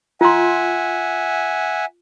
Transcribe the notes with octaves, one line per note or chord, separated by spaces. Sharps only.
F4 E5 F#5 G#5 C6